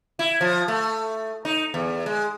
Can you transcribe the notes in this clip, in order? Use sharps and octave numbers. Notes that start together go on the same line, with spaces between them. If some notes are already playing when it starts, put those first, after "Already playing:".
E4
F3
A3
D#4
E2
G#3